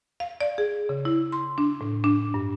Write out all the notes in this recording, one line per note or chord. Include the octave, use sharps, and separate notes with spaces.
F5
D5
G#4
C#3
E4
C6
D4
A2
D4
G2